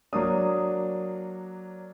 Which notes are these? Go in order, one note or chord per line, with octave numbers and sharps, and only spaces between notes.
F#3 A#3 D4 D#6